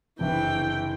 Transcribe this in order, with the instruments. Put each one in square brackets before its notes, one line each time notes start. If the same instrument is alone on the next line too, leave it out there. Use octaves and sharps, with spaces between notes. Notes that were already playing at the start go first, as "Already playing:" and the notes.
[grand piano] F#1 C3 D4 [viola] E3 G5